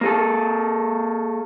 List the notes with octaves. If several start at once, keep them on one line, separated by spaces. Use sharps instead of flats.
A#3 G#4 A4